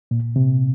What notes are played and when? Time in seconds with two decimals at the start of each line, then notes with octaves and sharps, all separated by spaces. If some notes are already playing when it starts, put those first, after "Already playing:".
0.11 A#2
0.36 C3